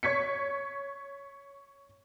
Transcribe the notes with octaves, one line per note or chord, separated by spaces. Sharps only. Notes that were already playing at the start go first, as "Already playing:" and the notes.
C#5 C#6 G#6 B6 C#7